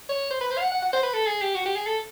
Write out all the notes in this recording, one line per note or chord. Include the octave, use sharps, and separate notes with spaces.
C#5
C5
B4
C5
F5
F#5
F#5
F#5
C5
B4
A4
G#4
G4
F#4
G4
G#4
A4